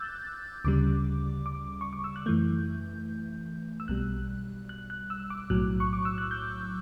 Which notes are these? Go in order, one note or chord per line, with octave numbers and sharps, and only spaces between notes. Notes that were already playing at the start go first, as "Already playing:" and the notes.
Already playing: D6 E6 F#6 G6 A6
D2 C#3 G3 D6
D6
C#6
D6
E6
F#6
F#2 E3 A3 G6
E6
B1 B2 G3 F#6
F#6
F#6
E6
D6
B1 A2 F#3 F#6
C#6
D6
E6
F#6
G6